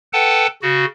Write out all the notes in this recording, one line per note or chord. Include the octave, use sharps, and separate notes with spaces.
A4 B4 F#5 G5 A5
C#3 F#4